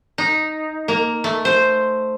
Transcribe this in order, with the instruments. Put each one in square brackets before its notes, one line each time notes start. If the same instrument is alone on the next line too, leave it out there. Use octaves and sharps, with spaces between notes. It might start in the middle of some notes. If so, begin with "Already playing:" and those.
[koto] D#4
A#3
A3
C5